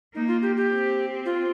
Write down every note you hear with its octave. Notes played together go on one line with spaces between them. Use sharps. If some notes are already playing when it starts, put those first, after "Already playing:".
A#3 D#4
F4
G4
G4
C4
F4